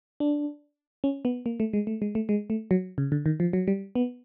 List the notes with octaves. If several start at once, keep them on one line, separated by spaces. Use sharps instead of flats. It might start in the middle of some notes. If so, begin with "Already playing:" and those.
D4
C#4
B3
A#3
A3
G#3
A3
G#3
A3
G#3
A3
F#3
C#3
D3
D#3
F3
F#3
G3
B3